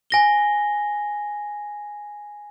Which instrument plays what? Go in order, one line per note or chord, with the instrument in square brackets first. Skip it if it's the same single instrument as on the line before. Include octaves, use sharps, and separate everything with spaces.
[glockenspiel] G#5 A#6 G7